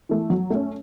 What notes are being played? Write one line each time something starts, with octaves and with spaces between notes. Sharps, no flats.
E3 A3
F#3
A3 C#4